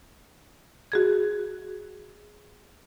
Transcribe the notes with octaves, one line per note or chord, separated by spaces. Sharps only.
F#4 G#4 G#6